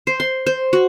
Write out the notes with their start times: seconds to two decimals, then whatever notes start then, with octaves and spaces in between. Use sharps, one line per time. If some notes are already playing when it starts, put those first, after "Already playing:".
0.07 C5
0.20 C6
0.46 C5
0.73 F#4